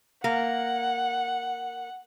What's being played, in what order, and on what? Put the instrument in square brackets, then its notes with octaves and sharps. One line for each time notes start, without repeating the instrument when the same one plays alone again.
[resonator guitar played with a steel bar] A#3 [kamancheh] F#5